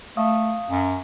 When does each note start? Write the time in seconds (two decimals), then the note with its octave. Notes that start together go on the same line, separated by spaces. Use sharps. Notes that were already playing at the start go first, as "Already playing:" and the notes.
0.17 A3 F5 D#6
0.70 F#2